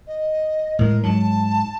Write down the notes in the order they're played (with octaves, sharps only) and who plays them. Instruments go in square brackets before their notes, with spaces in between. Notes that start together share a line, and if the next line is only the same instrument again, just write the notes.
[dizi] D#5
[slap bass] A2 G#3 [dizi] A#4
[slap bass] G#2 F#3 [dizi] A5